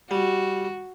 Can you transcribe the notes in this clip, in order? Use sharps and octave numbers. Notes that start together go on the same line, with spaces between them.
G3 F#4